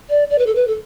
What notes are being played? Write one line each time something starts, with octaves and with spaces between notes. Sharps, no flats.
D5
D5
B4
A4
B4
A4